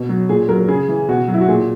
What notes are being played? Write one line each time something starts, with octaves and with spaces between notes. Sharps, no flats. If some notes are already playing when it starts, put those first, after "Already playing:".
Already playing: B2
F#3
A#2 G#4
F#3 A#4
C#3 G#4
E3
B2 F#4
F#3
E4
F#4
A#2 G#4